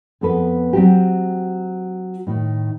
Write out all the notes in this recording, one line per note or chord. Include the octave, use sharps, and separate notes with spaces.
F2 B3 A4 B4
F#3 C4 G4
A2 D#3